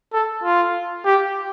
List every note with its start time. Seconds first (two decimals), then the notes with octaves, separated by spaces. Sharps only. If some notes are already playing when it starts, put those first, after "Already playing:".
0.13 A4
0.44 F4
1.05 G4